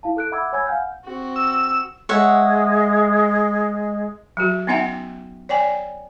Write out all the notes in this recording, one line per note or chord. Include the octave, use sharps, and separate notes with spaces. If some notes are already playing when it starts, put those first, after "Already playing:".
E4 F5 A5
A4 F#6 D7
E5 F#5 B5 D6 E6 G#6
C#5 G#5 B5 E6 G#6
F5 F#5 G#5 F6 G6
C4 F#4
E6
G#3 C#5 E5 F#5
F#3 F#4
B3 C#4 D#4 E5 F#5 G5
C#5 D5 G5 G#5